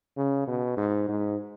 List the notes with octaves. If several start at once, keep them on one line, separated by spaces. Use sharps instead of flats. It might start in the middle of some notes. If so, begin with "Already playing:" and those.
C#3
B2
G#2
G#2